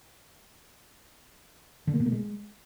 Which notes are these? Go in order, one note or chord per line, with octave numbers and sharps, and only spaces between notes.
D3
A#3
B2
A#3
G#3